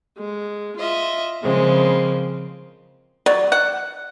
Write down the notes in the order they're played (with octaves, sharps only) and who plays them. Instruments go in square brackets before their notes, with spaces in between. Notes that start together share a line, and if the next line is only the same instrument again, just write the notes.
[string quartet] G#3
F4 D#5 E5
C#3 F3 G#3 A#3 C4
[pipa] F#3 [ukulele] D5
[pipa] F#5